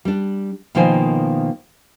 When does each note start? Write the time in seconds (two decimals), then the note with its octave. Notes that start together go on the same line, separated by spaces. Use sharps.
0.05 G3 D4
0.75 B2 D#3 F3 A#3 C5 G#5